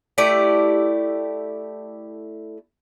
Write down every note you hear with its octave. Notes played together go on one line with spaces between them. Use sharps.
A3 E4 G4 D5